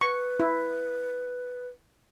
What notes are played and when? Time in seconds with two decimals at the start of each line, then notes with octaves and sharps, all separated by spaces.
0.01 B4 C#6
0.40 E4